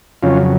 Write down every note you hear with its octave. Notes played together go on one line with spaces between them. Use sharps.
F2 C#3 F#3 C#4 F4